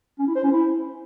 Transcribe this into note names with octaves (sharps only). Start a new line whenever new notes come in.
C#4
E4
C5
C#4
E4